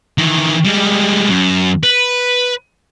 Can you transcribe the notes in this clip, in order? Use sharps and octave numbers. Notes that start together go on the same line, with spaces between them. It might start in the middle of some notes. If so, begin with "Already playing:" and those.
D#3 E3
G3 G#3
F#2
B4